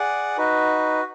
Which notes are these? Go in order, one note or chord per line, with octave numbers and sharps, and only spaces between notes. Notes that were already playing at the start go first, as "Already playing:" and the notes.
Already playing: G#4 D5 F#5
D#4 F#4 B4